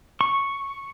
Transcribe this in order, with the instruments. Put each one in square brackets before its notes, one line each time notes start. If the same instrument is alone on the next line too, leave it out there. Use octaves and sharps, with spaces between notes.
[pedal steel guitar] C#6